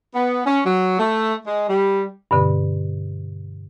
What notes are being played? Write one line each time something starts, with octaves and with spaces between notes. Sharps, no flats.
B3
C#4
F#3
A3
G#3
G3
G2 B2 D3 C4